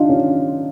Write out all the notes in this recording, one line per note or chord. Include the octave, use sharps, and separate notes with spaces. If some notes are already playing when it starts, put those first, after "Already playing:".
Already playing: D4 D#4 F4
C#4